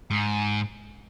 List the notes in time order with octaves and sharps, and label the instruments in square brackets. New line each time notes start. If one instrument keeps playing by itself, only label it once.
[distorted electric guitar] G#2